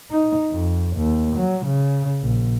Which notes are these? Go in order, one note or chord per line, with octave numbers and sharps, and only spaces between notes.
D#4
F2
D#2
F#3
C#3
A#1